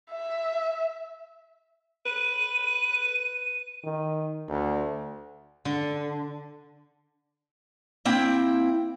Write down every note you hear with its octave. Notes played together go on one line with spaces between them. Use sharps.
E5
B4 D#7
D#3
D2
D3
A#3 C4 E4 G5